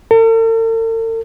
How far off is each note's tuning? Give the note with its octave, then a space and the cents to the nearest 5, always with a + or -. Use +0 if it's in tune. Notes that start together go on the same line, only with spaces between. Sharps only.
A4 +45